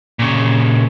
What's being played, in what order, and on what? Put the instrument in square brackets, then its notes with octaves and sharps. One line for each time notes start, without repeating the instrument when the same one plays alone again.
[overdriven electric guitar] A#2 C#3